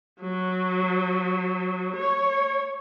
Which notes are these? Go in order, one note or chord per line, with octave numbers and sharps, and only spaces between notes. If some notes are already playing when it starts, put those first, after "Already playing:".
F#3
C#5